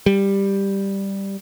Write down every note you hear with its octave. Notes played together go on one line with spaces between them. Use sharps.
G3